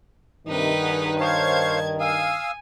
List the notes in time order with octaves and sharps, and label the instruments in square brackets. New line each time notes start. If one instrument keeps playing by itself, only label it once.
[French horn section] G2 D#3 [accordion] C3 [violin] D#4 B4
[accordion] G#4 F#5
[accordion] C5 C#5 F5 [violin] A5 G#6
[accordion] F5 D#6 E6 [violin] G#5